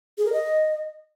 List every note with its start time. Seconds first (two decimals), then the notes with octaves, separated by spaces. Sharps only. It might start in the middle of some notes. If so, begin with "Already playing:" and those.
0.18 G#4
0.25 A#4
0.33 D#5